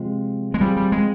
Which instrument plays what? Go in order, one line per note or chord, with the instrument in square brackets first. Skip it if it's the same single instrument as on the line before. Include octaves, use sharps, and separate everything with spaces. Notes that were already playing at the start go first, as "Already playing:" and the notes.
Already playing: [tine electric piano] C3 F3 C4 F4 [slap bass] G#3
[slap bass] G#3
[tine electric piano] F3 C4 F4 G#4 [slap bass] G3
[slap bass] G3
G#3